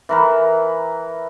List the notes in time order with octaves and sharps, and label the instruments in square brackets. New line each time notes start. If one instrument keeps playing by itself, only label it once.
[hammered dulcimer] E3 A#4 B4